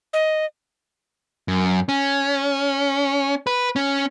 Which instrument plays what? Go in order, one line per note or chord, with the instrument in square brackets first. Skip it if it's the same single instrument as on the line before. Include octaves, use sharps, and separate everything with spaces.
[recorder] D#5
[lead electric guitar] F#2
C#4
B4
C#4